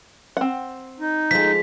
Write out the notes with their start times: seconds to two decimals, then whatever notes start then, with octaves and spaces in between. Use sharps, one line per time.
0.37 C4 F#5
1.00 D#4
1.31 F3 G#3 B6